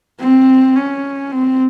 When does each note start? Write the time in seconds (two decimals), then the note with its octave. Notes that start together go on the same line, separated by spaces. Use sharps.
0.20 C4
0.76 C#4
1.32 C4